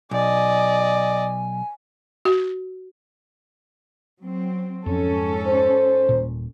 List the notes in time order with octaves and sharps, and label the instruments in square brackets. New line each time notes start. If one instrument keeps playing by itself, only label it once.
[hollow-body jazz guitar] B1 [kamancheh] D5 D#5 [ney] G#5
[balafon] F#4
[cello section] F#3 C4
[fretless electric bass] F2 F3 [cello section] G#2 C#4 A4
[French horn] C5
[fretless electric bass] D#1 A#2